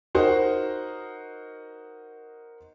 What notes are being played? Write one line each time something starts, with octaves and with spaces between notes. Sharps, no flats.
D#4 F#4 A#4 C5